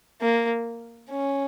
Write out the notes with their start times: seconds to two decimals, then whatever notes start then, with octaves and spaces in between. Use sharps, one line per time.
0.21 A#3
1.10 C#4